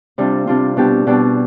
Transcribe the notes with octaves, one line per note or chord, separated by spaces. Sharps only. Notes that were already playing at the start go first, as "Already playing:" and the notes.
C3 G3 D4 F4
C3 G3 D4 F4
B2 G3 D4 G4
B2 G3 D4 G4